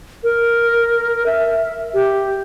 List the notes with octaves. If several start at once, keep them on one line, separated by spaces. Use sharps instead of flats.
A#4
E5
G4